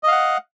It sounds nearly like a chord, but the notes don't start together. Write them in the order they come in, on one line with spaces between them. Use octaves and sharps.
D#5 F5 F#5